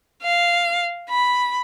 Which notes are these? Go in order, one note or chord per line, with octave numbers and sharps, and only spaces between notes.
F5
B5